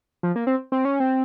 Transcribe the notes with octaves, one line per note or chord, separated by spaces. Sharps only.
F3
A#3
C4
C4
C#4
C4